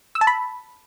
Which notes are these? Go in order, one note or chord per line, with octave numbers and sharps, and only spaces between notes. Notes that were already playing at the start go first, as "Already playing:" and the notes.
E6
A5
B5